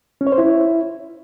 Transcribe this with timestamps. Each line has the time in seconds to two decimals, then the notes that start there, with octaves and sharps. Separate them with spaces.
0.21 C#4
0.27 C#5
0.32 C5
0.38 E4